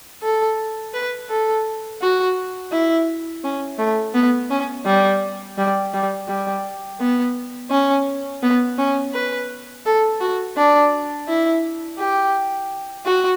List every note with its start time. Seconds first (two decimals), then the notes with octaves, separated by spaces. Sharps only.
0.23 A4
0.94 B4
1.30 A4
2.02 F#4
2.72 E4
3.44 C#4
3.79 A3
4.15 B3
4.50 C#4
4.86 G3
5.58 G3
5.94 G3
6.28 G3
7.00 B3
7.71 C#4
8.42 B3
8.78 C#4
9.13 B4
9.86 A4
10.21 F#4
10.57 D4
11.28 E4
11.99 G4
13.06 F#4